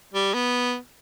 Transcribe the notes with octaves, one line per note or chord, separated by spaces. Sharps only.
G3
B3